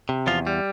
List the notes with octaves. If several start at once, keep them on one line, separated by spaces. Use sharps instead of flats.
C3
E2 F3 F4
G3